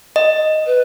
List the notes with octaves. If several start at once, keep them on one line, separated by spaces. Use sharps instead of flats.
D#5
B4